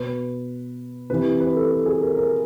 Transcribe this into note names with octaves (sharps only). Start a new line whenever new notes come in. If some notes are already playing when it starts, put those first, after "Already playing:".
Already playing: B2 B4
C3 E3 B4
B4
A4
A4
G#4
A#4
A#4